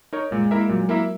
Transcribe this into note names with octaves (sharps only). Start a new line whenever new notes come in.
D#4 A#4 C#5
A#2 G#3
A#3 E4 A#4 E5
A#2 F#3
A#3 E4 A#4 E5